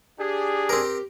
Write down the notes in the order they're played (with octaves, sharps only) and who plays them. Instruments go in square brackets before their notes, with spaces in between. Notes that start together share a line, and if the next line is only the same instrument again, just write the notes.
[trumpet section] D4 G#4 [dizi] G4
[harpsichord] C4 A#4